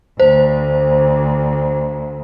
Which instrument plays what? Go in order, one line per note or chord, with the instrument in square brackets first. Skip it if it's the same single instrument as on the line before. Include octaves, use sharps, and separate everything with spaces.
[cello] D2 [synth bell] C5